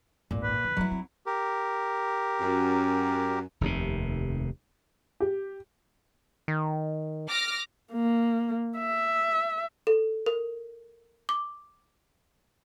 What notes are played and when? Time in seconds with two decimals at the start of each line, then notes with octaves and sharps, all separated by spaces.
0.31 G#1 C#2 A#2
0.43 B4
0.64 F2 D#3
0.77 F#2 F3 F#3 E4
0.91 C4
1.26 G4 A#4
2.40 F#2
3.61 F1 D#2 G#2 C3
5.20 G4
6.48 D#3
7.27 D6 F6 A#6
7.92 A#3
8.78 E5
9.87 A4
10.26 A#4
11.29 D6